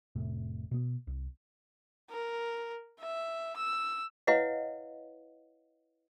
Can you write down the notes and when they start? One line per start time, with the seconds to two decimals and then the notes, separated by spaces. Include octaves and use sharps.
0.16 F1 A2 C3
0.71 B2 B3
1.07 C2
2.10 A#4
3.00 E5
3.57 E6
4.27 E4 B4 C#5 D#5 F5 F#5